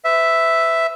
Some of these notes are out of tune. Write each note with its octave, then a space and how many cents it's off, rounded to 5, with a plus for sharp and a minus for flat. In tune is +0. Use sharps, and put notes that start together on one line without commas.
B4 +35 E5 +0